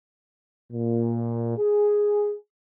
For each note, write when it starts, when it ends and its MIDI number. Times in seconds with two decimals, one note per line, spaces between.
0.73 1.58 46
1.58 2.33 68